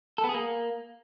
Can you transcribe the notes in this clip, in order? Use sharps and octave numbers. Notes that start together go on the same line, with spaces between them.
A4
B3
G#4
A#3